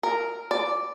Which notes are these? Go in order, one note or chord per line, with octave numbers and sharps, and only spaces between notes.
A#4
D5